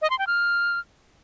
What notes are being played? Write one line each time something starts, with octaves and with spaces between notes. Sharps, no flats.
D#5
C6
G5
F6